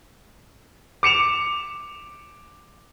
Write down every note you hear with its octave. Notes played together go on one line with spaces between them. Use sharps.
D6 C#7 E7 F7